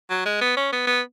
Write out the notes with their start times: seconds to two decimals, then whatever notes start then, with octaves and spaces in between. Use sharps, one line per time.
0.10 F#3
0.25 G#3
0.41 B3
0.57 C#4
0.72 B3
0.87 B3